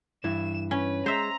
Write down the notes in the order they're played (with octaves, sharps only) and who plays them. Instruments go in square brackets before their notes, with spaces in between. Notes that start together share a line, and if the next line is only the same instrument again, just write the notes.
[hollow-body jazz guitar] G2 E3 E4 [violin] E7
[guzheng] C#4 [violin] B4
[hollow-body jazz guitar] G#3 [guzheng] C5 E5 [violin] A#5